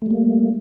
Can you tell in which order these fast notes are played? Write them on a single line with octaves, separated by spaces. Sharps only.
A3 G3 A#3